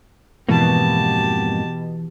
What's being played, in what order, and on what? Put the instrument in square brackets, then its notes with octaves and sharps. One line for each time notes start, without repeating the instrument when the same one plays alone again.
[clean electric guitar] F2 G#2 A#3 [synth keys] B2 [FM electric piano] E3 [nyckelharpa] G4 A5